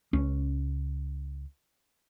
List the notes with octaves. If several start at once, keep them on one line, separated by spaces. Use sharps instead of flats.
C#2 C#4